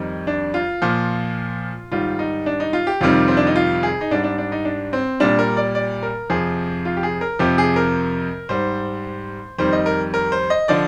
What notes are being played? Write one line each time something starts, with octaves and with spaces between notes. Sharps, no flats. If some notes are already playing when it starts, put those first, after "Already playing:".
Already playing: F2 D#3 G3 D#4
D4
F4
A#2 F3
G#2 D#3 G3 F4
D#4
D4
D#4
F4
G4
F2 C3 D#3 G3 F4
C4
D4
D#4
F4
G#4
D#4
G#2 G3 D4
D4
D4
D#4
D4
C4
A#2 G3 D4
A#4
D5
D5
A#4
F2 C3 F3 G#4
F4
G4
G#4
A#4
F2 C3 F3 G4
G#4
A#4
G#2 G3 C5
F2 D#3 G3 C5
D#5
A#4
A#4
C5
D#5
D3 F3 D5